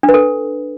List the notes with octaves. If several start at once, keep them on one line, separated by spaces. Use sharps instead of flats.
D4
B4
A4